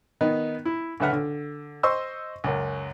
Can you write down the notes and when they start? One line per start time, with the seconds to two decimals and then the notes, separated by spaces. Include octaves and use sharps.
0.21 D#3 B3 D#4
0.65 E4
1.00 C#2 D3 B4 E5 F#5 F6
1.13 D3
1.83 C5 D#5 C6 C#6 E6
2.44 C#2 F#2